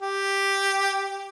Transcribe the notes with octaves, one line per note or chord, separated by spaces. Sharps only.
G4